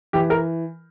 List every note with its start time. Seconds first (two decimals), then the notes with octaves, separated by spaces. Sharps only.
0.13 E3 G4
0.30 A#4